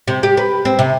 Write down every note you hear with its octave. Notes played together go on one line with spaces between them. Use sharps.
C3
G4
B4
C4
C3